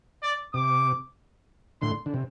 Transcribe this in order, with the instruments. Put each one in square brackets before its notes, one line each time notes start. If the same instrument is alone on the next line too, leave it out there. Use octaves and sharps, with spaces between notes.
[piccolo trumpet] D5
[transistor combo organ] C3 [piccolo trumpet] D6
[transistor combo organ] A2 D3 [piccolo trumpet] C6
[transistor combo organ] D3
C3